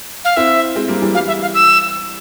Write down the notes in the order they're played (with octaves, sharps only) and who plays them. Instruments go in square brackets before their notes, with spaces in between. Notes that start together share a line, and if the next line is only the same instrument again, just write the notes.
[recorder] F5
[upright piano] C4 E4 [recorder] E5
[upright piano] G#3 C4
G3 A#3
E3 G3
[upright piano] E3 G3 [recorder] F5
[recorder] E5
F5
E6